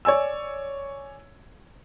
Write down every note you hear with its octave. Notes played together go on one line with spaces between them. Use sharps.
C#5 D5 G#5 E6